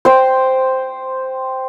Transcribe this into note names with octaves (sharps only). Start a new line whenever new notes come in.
C5 G5